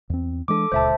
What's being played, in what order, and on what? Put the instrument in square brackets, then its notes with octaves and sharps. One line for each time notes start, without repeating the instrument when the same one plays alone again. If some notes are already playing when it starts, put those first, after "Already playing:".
[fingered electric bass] E2 C4
[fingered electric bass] E3 G#3 D4 [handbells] A4 D6
[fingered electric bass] D1 C#2 A#2 [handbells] C5 E5 A5